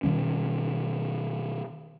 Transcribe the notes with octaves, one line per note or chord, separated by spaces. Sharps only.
B2 D#3 G3 C#4